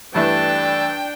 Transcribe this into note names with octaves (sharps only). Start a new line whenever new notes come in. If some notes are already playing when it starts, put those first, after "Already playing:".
G2 E3 A3 D4 G5 A5